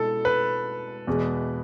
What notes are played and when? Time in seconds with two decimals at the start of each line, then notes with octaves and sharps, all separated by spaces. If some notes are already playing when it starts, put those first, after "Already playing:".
Already playing: B2 G#3 E4 A4
0.25 B4
1.07 E2 B2 G#3